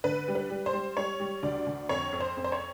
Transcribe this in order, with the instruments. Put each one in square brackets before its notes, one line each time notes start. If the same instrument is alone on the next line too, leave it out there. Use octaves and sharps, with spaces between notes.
[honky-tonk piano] D3 B4
G3
B4
G3
C5
G3
G3 C#5
G3
D2 D5
D2
F2 C#5
F2
C5
F2
C5
C#5